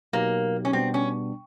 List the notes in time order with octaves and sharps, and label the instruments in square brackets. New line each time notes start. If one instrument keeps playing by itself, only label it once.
[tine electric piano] B2 F#3 B3 D#4 G4 [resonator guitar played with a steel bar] A#3
[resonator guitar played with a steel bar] C#4
[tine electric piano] B2 G3 B3 D4 [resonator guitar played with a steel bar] C4
[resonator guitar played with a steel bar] C#4